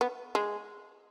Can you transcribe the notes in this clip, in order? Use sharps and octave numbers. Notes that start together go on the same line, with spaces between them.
B3
G#3